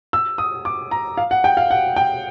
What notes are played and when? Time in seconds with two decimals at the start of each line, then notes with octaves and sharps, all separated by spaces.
0.13 E6
0.38 D#6
0.65 D6
0.91 A#5
1.17 F5
1.31 F#5
1.44 G5
1.57 F5
1.71 F#5
1.96 G5